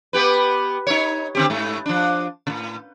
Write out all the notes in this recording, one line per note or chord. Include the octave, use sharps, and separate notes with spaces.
B3 G4 B4
D#4 C#5
D3 C4 G4
G#2 A3
F3 D4
A2 C3